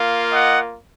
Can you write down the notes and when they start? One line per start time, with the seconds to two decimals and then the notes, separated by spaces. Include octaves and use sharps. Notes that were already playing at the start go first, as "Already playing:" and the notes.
Already playing: A#3 F4
0.31 D#5 F#5